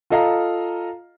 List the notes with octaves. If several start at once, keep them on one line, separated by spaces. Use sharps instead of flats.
F4 A4 D#5 F5 A#5